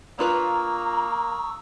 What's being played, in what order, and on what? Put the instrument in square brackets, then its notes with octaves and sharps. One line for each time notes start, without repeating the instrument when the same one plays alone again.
[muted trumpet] A#3 [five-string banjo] D4 F4 B4 [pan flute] A#5 [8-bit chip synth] C#6 D#6 E6